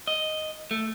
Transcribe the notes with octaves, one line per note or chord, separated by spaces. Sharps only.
D#5
A3